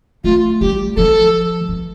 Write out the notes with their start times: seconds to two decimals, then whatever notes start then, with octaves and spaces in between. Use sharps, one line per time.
0.24 A3 F4
0.61 G3 G4
0.96 F3 A4
1.68 E3